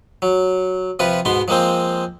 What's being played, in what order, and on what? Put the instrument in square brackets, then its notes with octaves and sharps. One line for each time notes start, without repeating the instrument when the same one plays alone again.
[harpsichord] F#3
C3 F3 F4 B4
G#2 B2 B3 C6
F3 G#3 A#3 C4 C5